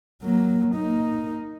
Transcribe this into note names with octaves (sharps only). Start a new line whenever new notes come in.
F#3 A#3
A#3 D#4